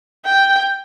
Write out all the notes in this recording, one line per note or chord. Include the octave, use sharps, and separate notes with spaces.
G5